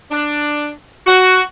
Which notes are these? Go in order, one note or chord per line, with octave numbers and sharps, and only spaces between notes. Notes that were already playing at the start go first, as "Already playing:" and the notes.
D4
F#4